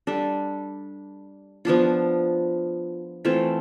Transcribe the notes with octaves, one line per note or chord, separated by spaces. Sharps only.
G3 D4 A4
F3 B3 D4 F4
E3 A3 C4 F4